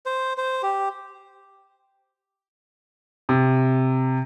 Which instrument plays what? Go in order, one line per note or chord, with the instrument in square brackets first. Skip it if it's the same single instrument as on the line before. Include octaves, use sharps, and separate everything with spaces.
[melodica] C5
C5
G4
[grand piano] C3